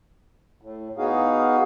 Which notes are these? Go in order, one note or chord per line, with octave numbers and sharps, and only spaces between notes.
A2
B3 D#4 F#4 G#4 F5